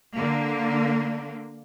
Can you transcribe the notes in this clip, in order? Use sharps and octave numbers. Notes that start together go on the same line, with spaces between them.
D3 A#3